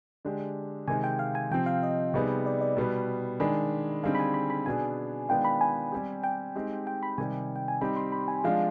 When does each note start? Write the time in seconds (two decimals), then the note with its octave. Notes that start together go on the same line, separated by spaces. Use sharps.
0.25 D3 G#3 D4 G4
0.88 C3 D#3 G#3 C4 G#5
1.04 G5
1.19 F5
1.35 G#5
1.51 C3 F3 C4 G5
1.66 F5
1.83 D#5
2.14 C3 G3 B3 D#4 G#4
2.46 D5
2.61 D5
2.77 B2 G3 B3
3.40 D#3 G#3 D4 G#4 B5
4.03 D3 G3 C4 D#4 G#4 F5
4.15 B5
4.20 G#5
4.34 B5
4.50 B5
4.66 B2 B3 D4 G#4 G#5
5.29 D#3 G#3 B3 D4 F4 G5
5.45 B5
5.61 G#5
5.92 G3 C4 G4
6.24 G5
6.56 G#3 C4 D#4 G4
6.87 G5
7.03 B5
7.18 C3 D#3 G3 G#5
7.56 G5
7.68 G#5
7.81 G3 C4 D#4 G4 B5
7.96 C6
8.12 B5
8.28 G#5
8.44 F3 G#3 D4 F4 F5